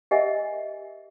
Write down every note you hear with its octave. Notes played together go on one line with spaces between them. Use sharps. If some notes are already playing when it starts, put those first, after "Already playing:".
G4 A#4 D#5 E5 F#5 G#5